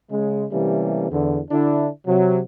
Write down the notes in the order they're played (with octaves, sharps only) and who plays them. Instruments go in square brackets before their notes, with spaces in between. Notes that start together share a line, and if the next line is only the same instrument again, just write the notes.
[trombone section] C#3 G#3
C3 E3 G3 A3 A#3 C#4
E2 D3
D3 D4 E4
C3 F#3